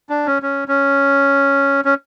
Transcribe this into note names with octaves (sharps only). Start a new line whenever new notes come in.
D4
C#4
C#4
C#4
C#4